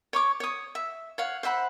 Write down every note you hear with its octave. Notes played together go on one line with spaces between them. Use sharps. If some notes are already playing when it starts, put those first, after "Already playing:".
C#5 C#6 D6
C#5 D#6
E5
C#5 F5 F#5
C5 E5 F#5 B5